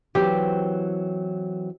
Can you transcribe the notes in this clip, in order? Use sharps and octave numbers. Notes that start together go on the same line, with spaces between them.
E3 F#3 C4 G4